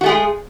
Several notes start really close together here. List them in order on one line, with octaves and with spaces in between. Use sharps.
F#4 A3 G#4 G#3